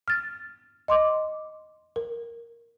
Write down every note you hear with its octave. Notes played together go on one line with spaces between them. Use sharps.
F6 A6
D#5 C6 D6
A#4